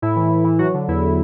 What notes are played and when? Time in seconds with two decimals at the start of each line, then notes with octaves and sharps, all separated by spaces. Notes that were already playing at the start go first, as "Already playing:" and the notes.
0.02 A2 E4
0.16 E3
0.31 A2
0.44 E3
0.59 F#3 F#4
0.74 D3
0.88 E2 E4